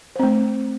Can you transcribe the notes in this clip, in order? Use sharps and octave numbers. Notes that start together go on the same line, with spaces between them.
A3 C4 C5